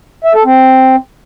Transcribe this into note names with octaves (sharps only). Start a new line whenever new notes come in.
E5
A4
C4